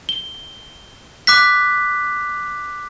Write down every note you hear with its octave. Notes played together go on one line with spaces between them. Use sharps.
G7
D6 F#6 B6